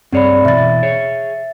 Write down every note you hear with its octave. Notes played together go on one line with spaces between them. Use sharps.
G2 C4 G#4 C#5 D5 B5
B2 E3 E5 A6
G#4 C#5